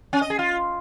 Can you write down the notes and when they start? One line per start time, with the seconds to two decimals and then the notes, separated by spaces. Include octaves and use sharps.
0.13 C#4
0.21 D#5
0.30 G#4
0.39 F4